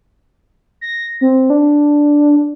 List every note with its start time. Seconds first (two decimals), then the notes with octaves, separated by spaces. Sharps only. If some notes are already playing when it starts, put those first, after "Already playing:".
0.81 A#6
1.21 C4
1.50 D4